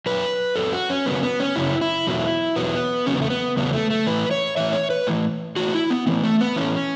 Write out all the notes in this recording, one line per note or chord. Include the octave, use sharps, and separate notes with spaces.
F#2 F#3 B4
F#2 F#3 A4
F#4
C#4
F#2 C#3 F#3 B3
B3
C#4
F#2 C#3 F#3 E4
E4
E2 B2 F#3
E2 B2 F#3 B3
E2 C#3 F#3 C#4
B3
A3
B3
E2 C#3 F#3 B3
A3
A3
A2 E3 B4
C#5
A2 E3 E5
C#5
B4
A2 E3
A2 E3 F#4
E4
B3
A2 E3 B3
A3
B3
A2 E3 C#4